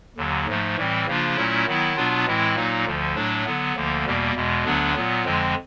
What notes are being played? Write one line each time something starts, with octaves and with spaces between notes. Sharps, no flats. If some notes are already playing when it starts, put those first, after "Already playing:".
D#2 D3 F#3
G#2 F3 A3
A2 E3 G3 C4
C#3 F3 A#3 D4 F4
A#2 F#3 A3 C#4 E4
D#3 F#3 B3 E4
B2 F#3 B3 D4 F4
A2 E3 G#3 C4 E4
A#2 F#3 A#3 D#4
D2 D3 F3
A2 F#3 A3 D4
D3 F#3 B3
D2 D3 F3 A#3
E2 B2 G3 A#3
E2 B2 G#3
D2 D3 F#3 B3 D4
A#2 F#3 B3
F2 D3 F3 G#3 C4